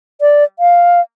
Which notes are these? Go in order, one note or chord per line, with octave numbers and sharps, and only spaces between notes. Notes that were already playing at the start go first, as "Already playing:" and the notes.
D5
F5